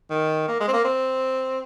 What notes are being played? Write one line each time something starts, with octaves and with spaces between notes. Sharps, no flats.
D#3
A#3
G#3
C4
A#3
C4